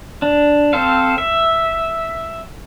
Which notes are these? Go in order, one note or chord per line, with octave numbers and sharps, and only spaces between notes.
D4
C4 A4 C5 F5
E5